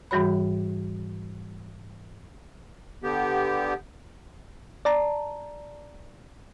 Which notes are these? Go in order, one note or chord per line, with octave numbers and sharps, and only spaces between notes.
G#2 E3 G3 F#4 C#5 B5
D3 B3 G4
D5 A5 A#5